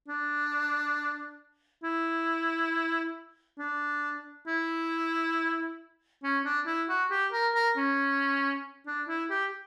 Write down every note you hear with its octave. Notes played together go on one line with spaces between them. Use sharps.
D4
E4
D4
E4
C#4
D4
E4
F#4
G4
A#4
A#4
C#4
D4
E4
G4